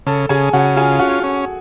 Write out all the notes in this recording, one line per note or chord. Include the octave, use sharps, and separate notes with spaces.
C#3 A4 A5
C#3 G#4 G#5
C#3 F#4 F#5
F4 G#4 G#5
C#4 F#4 F#5
C#4